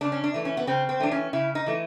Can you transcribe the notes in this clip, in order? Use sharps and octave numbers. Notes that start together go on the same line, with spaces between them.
C#3 D4
C#4
D4
E3 A3
C#4
B3
C#3 C4
C4
E3 A3 D4
C#4
C#3 E4
D#4
E3 A3